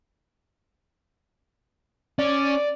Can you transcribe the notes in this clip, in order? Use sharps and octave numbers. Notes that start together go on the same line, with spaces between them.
C#4 D5